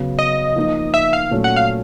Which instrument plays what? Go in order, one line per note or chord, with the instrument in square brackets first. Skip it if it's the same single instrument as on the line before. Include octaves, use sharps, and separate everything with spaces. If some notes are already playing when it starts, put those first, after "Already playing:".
Already playing: [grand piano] C#3 F#3 B3
[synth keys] D#5
[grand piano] F3 A#3 D#4
[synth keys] E5
F5
[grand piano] A#2 F#3 A3 C#4
[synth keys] F#5
F5